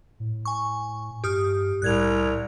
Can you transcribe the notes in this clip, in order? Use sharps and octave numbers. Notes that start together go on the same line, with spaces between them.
A2
G#5 C#6
G2 G4 D#6 F6
C2 A2 F#6 G#6 F7